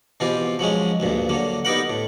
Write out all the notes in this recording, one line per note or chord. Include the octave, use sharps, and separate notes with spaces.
B2 E3 C4 F4 G4
F3 F#3 G#3 C#4
D2 G2 A#2
D3 F#3 A#3
B3 D#4 G4 A#4 F#5
A2